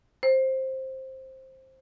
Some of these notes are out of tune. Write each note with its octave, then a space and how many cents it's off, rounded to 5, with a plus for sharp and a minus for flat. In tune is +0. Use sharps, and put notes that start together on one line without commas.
C5 +10